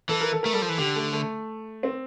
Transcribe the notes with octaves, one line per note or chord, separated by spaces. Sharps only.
E3 A4
A#4
A4
A3 A#4
G3 A4
F3
E3
D3 G4
A3
A3
C4